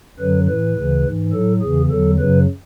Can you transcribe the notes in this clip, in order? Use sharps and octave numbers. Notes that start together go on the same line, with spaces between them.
F#2 D3 F#3 B4
A2 E3 B4
D2 C#3 E3
G#2 E3
A2 F#3 A4
E2 C#3 E3 G#4
E2 D3 F#3 A4
F#2 C#3 F#3 B4